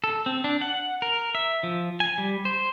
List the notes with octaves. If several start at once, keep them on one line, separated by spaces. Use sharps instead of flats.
A4
C4
D4
F#5
A#4
E5
F3
G#5
G3
C5